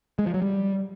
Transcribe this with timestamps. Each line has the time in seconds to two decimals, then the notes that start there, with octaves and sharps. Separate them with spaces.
0.19 G#3
0.26 F3
0.34 F#3
0.42 G3